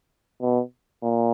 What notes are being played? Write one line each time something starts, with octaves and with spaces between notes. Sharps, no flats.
B2
A#2